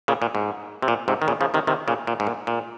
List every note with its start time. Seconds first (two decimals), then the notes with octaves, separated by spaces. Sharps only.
0.08 A#2 C#3
0.22 A#2
0.35 G#2
0.82 C3
0.88 A#2
1.08 G#2 C3
1.22 D#3
1.28 A#2 C#3
1.41 C#3 F3
1.54 C3 D#3
1.67 C3 D#3
1.88 A#2 C#3
2.07 A#2
2.20 G#2
2.27 A#2
2.47 A#2